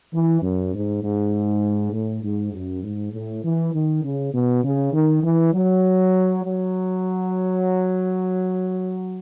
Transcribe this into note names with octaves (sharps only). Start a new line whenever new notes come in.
E3
F#2
G#2
G#2
A2
G#2
F#2
G#2
A2
E3
D#3
C#3
B2
C#3
D#3
E3
F#3
F#3